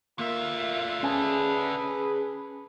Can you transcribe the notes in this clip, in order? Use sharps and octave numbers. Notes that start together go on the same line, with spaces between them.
D3 A#3 F4 E5
C#4 G#4 B4 G#5 A5